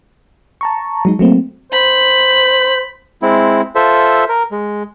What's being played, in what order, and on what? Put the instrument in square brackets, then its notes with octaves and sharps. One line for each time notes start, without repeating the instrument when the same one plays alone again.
[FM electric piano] A5 A#5 C#6
F#3 G#3 D#4
F#3 A3 A#3 C4
[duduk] C5 [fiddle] B5
[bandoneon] G#3 C4 E4
F4 A4 C5 E5
A#4
G#3